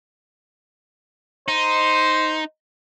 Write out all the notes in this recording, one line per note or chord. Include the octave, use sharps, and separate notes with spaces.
D#4 C5